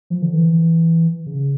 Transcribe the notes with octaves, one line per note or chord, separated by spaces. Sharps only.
F3
D3
E3
C#3